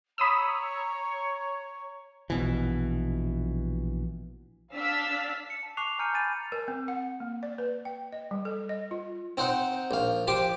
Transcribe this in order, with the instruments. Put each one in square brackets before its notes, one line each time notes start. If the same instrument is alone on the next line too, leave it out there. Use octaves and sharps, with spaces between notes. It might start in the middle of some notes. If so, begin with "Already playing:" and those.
[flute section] C#5 A#5 C#6 [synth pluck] B5 D#6 E6
[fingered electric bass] A#1 B2 E3
[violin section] D4 F5 E6 B6
[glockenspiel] C#7
A5
A5 C#6 D6 F#6 C7 F7
G#5 A#5 F6 G6 C#7 D#7
G#5 B5 A6 D#7
[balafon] A#4
C4
F#5
A#3
D5
B4
G5
D#5
G3
A4
D#5
F4
[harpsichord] C4 D#4 C5 F#5
A#1 F5
F3 G4 C6 D6